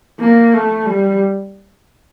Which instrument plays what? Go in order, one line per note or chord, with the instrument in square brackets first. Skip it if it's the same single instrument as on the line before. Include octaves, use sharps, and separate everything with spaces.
[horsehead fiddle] A#3
A3
G3